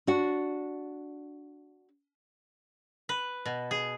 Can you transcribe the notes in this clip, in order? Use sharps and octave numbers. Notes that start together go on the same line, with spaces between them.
D4 F#4
B4
B2
G#4